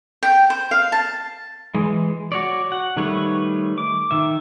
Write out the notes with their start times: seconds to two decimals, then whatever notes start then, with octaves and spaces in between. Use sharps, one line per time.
0.23 G5
0.50 C5
0.71 F5
0.92 A5
1.75 E3 G#3
2.32 F#4 C#5 D5
2.72 F#5
2.97 D#3 G3 A3 B4 C#5
3.78 D6
4.11 D#3 E5